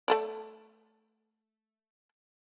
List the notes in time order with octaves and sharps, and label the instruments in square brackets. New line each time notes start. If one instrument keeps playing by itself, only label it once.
[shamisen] A3 A4 D5